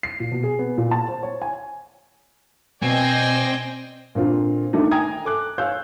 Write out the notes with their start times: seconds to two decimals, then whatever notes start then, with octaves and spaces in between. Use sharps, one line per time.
0.03 C7
0.20 A#2
0.32 B2
0.43 G#4
0.59 B3
0.78 A#2
0.91 A5
1.08 C5
1.23 C#5
1.42 G#5
2.82 B2 C4 D5 D#5 G5 G#5
4.15 A#2 D3 C4 F4
4.73 D#3 A3 D4 D#4
4.91 G5 G#5 A#5 D#6 G#6
5.25 A4 D6 F#6
5.58 C#5 F5 G#5 E6 G6